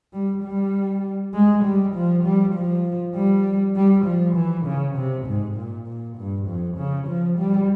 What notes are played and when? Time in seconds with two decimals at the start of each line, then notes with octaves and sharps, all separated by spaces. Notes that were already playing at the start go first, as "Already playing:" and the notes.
0.13 G3
0.44 G3
1.34 G#3
1.64 G3
1.94 F3
2.24 G3
2.55 F3
3.15 G3
3.76 G3
4.06 F3
4.36 E3
4.66 C#3
4.96 C3
5.27 G#2
5.57 A#2
5.87 A#2
6.17 G2
6.47 F2
6.78 C#3
7.08 F3
7.38 G3